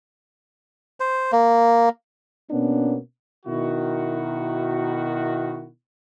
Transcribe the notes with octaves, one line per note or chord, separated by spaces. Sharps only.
C5
A#3
B2 A#3 B3 C#4 D4
B2 D#3 E4 F#4